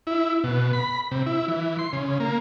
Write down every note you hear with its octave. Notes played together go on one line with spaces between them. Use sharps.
E4
B2
B5
C3
E4
E3
C6
C#3
A#3